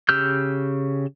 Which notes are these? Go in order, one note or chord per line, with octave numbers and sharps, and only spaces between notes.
C#3 G4 E6 F6 G6